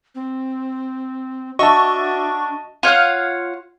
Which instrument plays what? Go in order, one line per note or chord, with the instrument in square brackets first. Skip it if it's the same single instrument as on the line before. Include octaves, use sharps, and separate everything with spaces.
[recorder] C4
[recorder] D4 [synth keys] F#4 E5 [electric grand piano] D#5 A5 [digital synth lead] C#6
[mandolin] F4 C#5 F5 F#5